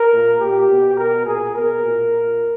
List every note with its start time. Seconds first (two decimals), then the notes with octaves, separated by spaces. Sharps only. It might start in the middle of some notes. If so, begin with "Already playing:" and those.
Already playing: A#4
0.12 A#2
0.40 A#2 G4
0.68 B2
0.97 B2 A#4
1.26 A#2 G#4
1.55 B2 A#4
1.84 A#2
2.13 A#2